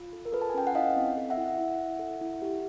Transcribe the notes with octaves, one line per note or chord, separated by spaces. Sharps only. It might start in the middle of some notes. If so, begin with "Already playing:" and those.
Already playing: F4
A4
A#4
F4 A4 B4
A5
G#5
C#4 G5
F#5
E4 D#5 F5
C4
A4
E5 F#5
E4
E4
E4
A4
E4
G4